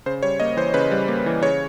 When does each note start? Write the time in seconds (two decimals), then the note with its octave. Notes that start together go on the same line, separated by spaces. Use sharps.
0.06 C#3 C5
0.23 G3 C#5
0.40 A#3 D#5
0.57 E3 C5
0.74 C#3 B4
0.92 G3
1.08 A#3
1.26 E3
1.43 C#3 C#5